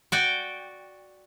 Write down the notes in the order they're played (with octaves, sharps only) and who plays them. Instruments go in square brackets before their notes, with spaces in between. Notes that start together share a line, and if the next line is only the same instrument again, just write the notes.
[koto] F#4 D5 G5